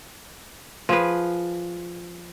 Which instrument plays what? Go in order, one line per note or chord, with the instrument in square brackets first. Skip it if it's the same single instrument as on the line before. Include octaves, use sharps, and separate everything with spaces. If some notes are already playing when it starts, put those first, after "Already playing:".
[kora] F3 G#4 B4